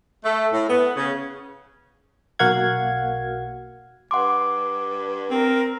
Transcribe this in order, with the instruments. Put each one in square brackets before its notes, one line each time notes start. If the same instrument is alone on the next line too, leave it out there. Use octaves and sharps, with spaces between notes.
[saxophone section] A3
A2
B3
C#3
[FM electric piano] B1 A#3 F#4 F5 F#5 G#6
[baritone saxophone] G2 [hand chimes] F#5 C6 D6
[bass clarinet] C4 [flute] A#4